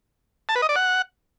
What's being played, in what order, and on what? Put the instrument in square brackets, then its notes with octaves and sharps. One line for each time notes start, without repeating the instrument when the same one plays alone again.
[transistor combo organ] A5
B4
D#5
D5
F#5